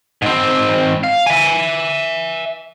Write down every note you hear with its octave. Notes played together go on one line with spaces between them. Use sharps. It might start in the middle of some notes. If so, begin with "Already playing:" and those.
G#2 C4
F5
E5 G#5